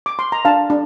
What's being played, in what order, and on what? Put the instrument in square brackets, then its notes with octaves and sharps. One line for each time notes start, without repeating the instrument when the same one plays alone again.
[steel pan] D6
C6
A#5
D4 F5 A5
D4